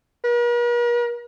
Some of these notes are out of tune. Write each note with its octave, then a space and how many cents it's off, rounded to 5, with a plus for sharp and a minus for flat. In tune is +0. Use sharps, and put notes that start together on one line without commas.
A#4 +45